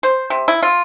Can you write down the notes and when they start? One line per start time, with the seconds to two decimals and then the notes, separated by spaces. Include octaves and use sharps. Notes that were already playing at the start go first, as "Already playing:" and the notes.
0.03 C5
0.30 C3
0.48 E4
0.63 F4